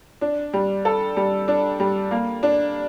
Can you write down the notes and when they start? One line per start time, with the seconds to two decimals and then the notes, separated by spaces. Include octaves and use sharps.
0.21 D4
0.53 G3
0.85 A4
1.17 G3
1.48 D4
1.80 G3
2.11 A#3
2.43 D4